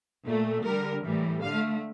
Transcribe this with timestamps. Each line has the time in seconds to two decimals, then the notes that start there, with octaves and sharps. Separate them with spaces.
0.26 A#2 A3
0.65 D3 G3 A#4
1.04 A2 E3 G3
1.42 D3 A3 F5